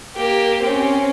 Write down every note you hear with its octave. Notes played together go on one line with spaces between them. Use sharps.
A#3 G4
C4 C#4